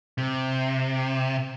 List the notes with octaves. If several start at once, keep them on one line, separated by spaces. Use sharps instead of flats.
C3